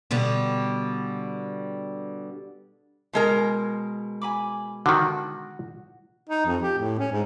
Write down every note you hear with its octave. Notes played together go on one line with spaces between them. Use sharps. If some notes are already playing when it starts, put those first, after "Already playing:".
B2 D3 G3
B2 G#3 A#4 C6
G#5 B5 D6
D3 D#3 F#4
D#4
F2
G4
A2
C#4
G#2